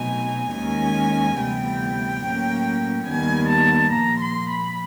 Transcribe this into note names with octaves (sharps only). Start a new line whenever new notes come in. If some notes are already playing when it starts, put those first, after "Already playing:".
Already playing: B2 F#3 A3 C4 D#4 G#5
D#2 D#3 G#3 C#4 G#5
D2 C3 E3 G3 B3 G5
A2 F#3 A#3 C#4
D#2 D#3 G3 B3 G#5
A5
A#2 F3 A#3 A#5
C6
B5